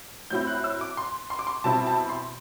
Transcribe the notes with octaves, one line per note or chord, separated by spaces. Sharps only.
A2 F#3 C4 E4 G6
F#6
E6
D6
C6
C6
D6
C6
B2 G3 C4 E4 A5
A5
C6